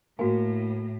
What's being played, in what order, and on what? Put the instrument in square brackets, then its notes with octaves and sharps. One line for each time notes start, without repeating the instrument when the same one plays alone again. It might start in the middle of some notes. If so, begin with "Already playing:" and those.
[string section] A2 [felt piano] A#3 [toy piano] F#4 G#5